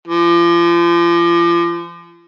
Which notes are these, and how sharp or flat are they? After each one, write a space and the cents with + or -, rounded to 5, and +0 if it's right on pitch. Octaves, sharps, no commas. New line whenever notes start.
F3 -35